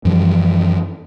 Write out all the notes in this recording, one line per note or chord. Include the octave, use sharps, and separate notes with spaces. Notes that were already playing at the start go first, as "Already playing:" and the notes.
F#2 E3 F3 G3